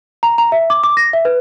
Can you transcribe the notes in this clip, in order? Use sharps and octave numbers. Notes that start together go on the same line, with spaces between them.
A#5
A#5
E5
D6
D6
A#6
E5
B4